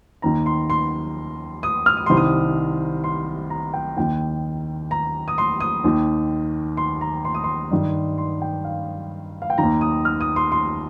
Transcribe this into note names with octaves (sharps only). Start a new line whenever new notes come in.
D#2 D#3 A#5
C6
C6
D#6
F6
D#6
C2 C3 D#3 C6
D#6
C6
A#5
G5
D#2 D#3 G5
A#5
D#6
C6
D#6
D#2 D#3
C6
A#5
C6
D#6
C6
G2 D#3
C6
G5
F5
F5
G5
D#2 D#3 A#5
D#6
F6
D#6
C6
C6